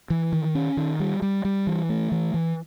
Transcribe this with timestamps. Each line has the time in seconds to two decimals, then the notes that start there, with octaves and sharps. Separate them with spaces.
0.10 E3
0.32 D#3
0.55 C#4
0.77 D#3
1.00 G3
1.22 G3
1.45 G3
1.67 E3
1.89 A3
2.12 E3
2.34 E3